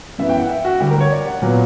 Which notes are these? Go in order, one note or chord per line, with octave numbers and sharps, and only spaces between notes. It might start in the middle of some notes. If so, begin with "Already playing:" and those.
F#2 E3 B3 E5
G5
F#5
E5
F#4
D2 D3 G3 G4
A#4
C#5
D5
F#5
A#2 F#3 B3